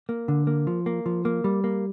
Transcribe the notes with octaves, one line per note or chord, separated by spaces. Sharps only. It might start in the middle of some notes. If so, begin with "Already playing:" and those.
A#3
D3
A#3
F3
A#3
F3
A#3
G3
A#3